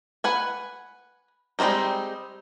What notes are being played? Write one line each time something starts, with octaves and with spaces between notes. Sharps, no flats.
B4 F#5 G#5
G3 G#3 A#3 C4 D#4